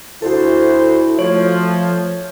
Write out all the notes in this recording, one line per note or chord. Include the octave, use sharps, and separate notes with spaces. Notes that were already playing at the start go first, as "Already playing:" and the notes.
D2 E4 F#4 A4 C5
F3 A3 C#5